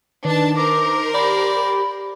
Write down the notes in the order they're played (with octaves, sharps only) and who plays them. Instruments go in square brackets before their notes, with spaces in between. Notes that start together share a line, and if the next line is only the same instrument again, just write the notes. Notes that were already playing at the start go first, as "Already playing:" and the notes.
[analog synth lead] D#3 [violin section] D4 A5 [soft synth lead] B4
[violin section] A#4 C5 [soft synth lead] D6
[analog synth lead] G4 [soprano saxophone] D5 [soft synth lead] B5